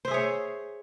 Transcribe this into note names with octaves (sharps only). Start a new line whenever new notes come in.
G#4 C5 C#5 E5